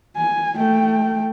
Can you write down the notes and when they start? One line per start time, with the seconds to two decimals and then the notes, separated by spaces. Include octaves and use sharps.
0.17 G#5
0.56 A3 G5